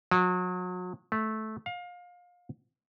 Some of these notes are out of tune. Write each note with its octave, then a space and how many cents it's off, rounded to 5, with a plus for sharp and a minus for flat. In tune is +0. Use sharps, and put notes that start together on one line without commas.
F#3 -35
A3 -10
F5 +25